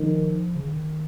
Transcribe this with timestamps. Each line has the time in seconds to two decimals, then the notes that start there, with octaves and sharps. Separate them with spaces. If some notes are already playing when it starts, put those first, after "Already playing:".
Already playing: D#3 F3
0.56 C#3
0.66 D#3